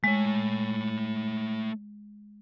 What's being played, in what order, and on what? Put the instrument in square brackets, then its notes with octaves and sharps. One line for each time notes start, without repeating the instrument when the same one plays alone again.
[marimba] G#3 [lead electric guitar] A3 C#5